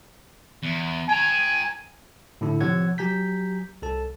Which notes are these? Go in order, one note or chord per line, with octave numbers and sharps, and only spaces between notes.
E2
G5 G#5 A#5
A2 D3 E4
C3 F3 C#5 F#5 E6 G#6
F#3 G4 G#5 A#5 G6 B6
C2 A4 A5